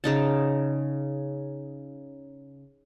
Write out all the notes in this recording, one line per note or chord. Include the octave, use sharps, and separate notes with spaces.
C#3 D#4 A5